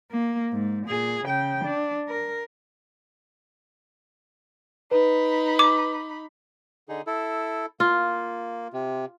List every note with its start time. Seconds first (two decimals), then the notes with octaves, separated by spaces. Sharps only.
0.11 A#3
0.52 G#2
0.87 A#2 G#4
1.25 C#3 G5
1.65 D4
2.09 A#4
4.91 D#4 B4 B5
5.59 D6
6.89 D3 D#4 G#4
7.07 E4 A4
7.80 A#3 F4
8.73 C3